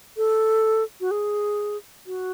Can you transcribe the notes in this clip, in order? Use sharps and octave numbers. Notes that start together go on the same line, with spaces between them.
A4
F#4
G#4
F#4